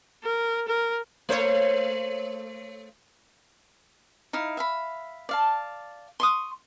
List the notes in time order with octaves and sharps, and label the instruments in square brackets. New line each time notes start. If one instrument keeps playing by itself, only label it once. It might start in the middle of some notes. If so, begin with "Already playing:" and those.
[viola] A#4
A#4
[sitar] A3 C5 C#5
[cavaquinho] D#4 E4 F5
E5 F5 B5
D5 F5 A5
C6 C#6 D#6